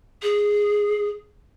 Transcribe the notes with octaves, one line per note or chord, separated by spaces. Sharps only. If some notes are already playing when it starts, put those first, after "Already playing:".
G#4